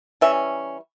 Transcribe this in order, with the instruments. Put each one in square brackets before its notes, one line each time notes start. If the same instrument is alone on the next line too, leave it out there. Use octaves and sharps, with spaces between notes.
[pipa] E3 G3 C#4 E5